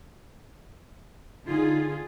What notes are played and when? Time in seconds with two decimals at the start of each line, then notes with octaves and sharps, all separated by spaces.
1.47 D3 D#4 F4 G#4